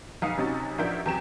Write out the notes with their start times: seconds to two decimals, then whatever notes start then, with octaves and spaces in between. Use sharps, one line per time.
0.22 F1 B1 F5 D#6 C#7 D#7
0.38 B1 C3 C#4 D#4 F#4 A6
0.78 A1 F3 D4 A#4 E5 G6
1.06 E2 C3 F#3 G5 E7